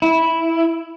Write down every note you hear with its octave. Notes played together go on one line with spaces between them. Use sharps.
E4